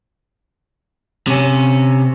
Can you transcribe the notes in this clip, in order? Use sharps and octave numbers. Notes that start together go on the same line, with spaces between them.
C3 C#4